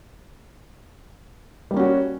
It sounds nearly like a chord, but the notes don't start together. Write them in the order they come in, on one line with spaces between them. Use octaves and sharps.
G3 A#3 C#4 F#4